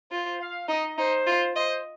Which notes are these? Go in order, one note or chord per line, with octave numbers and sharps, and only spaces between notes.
F4 C5
F5
D#4 D#5
D#4 C5
F4
C5 D#5